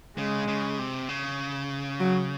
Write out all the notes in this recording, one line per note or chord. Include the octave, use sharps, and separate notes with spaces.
C#3 G#3
C#3
C3
C#3
F#3